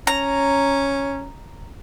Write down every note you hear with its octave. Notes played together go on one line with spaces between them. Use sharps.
C#4 A#5